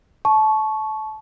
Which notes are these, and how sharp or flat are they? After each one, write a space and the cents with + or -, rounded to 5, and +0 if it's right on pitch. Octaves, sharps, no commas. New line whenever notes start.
A5 -25 C#6 +0